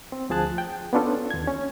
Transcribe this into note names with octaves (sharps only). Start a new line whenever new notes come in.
C4
D2 F3 G#4 A5 F#6
G5
B3 C#4 D4 F4 A4
D#2 G#6
C#4